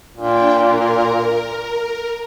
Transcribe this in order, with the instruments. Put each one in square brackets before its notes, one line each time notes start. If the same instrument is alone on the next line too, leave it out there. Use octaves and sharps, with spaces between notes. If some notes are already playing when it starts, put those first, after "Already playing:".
[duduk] A#2 [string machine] D4 G5
[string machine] A#4